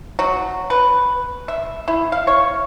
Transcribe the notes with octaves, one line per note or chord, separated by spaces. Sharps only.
F#3
B4
E5
E4
F5
C#5